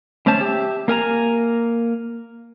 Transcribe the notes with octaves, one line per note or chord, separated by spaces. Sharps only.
D3 A3 C#4 C5 A5
G4 E5
A#3 A#4 G#5 A#5